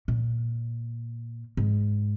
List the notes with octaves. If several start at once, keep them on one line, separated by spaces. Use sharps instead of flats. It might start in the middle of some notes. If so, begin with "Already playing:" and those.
A#2
G#2